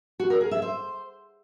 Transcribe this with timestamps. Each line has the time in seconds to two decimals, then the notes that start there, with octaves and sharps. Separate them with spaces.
0.20 F#4
0.30 A#4
0.41 G#4
0.51 E5
0.62 C5